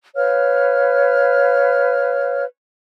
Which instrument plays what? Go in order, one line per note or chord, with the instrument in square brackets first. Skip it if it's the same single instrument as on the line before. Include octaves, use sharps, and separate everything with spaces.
[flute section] B4 C#5 F5 F6